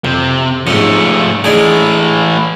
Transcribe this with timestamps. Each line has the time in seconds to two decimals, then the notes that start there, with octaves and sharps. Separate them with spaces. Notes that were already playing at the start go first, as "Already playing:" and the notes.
0.05 F2 C3
0.67 G#2 F3 A3 C#4
1.44 E3 G#3 A3 D4 G#4